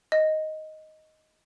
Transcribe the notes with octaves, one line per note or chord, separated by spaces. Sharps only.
D#5